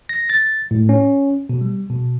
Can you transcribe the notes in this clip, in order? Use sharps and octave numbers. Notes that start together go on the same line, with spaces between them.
A#6
A6
A2
C#4
B2
G3
B2